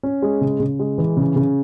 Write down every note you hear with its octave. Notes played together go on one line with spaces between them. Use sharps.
C#4
G#3
C#3
C#3
G#3
E3
C#3
C#3